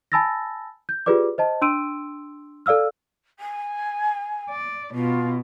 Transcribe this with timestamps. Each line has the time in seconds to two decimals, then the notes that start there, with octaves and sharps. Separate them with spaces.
0.12 G#5 A5 B5 E6 A6 A#6
0.89 G6
1.06 F4 G4 G#4 B4 D5 D6
1.38 C5 D#5 A5
1.62 D4 C6 E6 D7 D#7
2.66 A4 D5 F5 E6 F6
3.39 G#5
4.49 D5
4.93 B2 F4